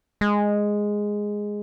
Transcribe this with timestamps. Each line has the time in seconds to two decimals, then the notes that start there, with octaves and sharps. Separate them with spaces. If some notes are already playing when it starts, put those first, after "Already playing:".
0.21 G#3